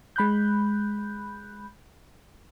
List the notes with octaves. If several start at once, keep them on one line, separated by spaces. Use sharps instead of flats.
G#3 B5 F#6 G6